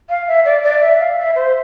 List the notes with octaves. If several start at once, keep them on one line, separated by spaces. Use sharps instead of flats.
F5
E5
D5
D5
E5
F5
E5
C5